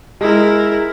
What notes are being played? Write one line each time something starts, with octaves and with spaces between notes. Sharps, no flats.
G#3 E4 A#4